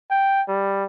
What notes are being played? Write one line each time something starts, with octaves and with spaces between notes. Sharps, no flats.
G5
G3